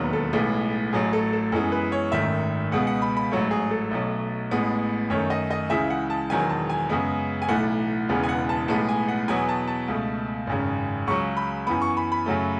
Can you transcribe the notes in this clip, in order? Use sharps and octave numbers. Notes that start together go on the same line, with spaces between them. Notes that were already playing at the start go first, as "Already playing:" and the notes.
Already playing: E1 D#2 D#3 F#3 B3
A4
B1 A2 G#3 B3 A4
A1 A2 F#3 A3 G#4
A4
A4
F#2 E3 G#3 B3 A4
B4
C#5
G#1 F#2 D#3 A3 E5
C#2 B2 G#3 B3 F#5
F#5
B5
B5
A1 G#2 F#3 A3 C#5
G#4
A4
B1 B2 F#3 A3
A1 A2 G#3 B3
F#2 D#3 A3 C#5
D#5
D#5
C#2 C#3 E3 G#3 E5
F#5
A5
E1 E2 D#3 F#3 G#5
A5
G#5
F#2 C#3 G#3 B3
G#5
B1 A2 E3 A3 F#5
E1 E2 C#3 E3 B3
G#5
F#5
A5
B1 A2 G#3 B3 A5
G#5
F#5
E2 B2 F#3 B3 G#5
A5
A5
C#2 B2 A3
G#1 F#2 C#3
C#2 C#3 F#3 C#6
B5
F#2 E3 B3 B5
C#6
B5
B5
F#2 C#3 F#3 A3